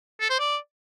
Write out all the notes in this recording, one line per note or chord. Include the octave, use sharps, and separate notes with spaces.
A4
C5
D5